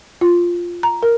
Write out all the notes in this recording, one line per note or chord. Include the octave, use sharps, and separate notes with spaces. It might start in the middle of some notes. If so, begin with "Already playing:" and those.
F4
A#5
A#4